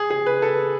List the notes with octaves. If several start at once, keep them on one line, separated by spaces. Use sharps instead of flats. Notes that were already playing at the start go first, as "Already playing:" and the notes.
Already playing: G#4
G#4
B4
A4